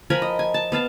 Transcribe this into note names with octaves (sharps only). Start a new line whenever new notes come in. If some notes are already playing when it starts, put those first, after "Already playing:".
F3 A#4 G#5 B5
D#5
G#5
A5
B3 F5 A5